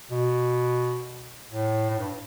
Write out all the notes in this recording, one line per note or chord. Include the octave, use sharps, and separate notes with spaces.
B2
A2
A2
G2